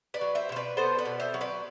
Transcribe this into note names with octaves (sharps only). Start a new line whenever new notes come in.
B4 D5
F#3
C5 E5
B2 C5
B4 D5
B3 A4 C5
B4 D5
B2
C5 E5
F#3
B4 D5